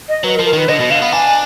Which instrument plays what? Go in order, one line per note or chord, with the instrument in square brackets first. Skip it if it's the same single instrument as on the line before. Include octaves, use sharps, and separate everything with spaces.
[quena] D#5
[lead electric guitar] F#3 [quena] B4
[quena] A#4
[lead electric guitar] F3
[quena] A#4
[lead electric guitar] D#3 [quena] B4
[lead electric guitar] D3 [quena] D#5
[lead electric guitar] B2
[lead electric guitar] D3 [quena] F5
[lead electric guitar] B3
[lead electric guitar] D4 [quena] G#5